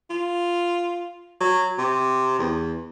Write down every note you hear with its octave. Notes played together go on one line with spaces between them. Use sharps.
F4
F#3
C3
E2